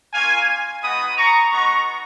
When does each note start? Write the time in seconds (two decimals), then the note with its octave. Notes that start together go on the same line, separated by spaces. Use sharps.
0.14 A#3 C#4 F4 F5 G#5
0.83 G#3 B3 D#4 F#4 B5 D#6
1.17 A#5 C#6
1.51 G#3 B3 D#4 F#4 A#5 C#6